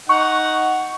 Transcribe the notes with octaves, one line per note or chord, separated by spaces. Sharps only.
D#4 F#5 C#6